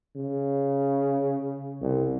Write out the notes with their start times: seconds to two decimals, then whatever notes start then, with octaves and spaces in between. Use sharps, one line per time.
0.16 C#3
1.81 C2